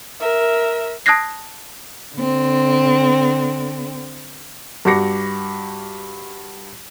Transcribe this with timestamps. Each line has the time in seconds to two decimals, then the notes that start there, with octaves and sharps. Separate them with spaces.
0.20 A#4 E5
1.06 A5 D#6 F#6 G#6 A#6 C7
2.15 D3 C4
4.85 G2 F#4 D6 A#6 C#7